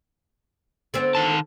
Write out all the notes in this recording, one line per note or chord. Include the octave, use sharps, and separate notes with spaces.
D3 B3 C4
D#3 A5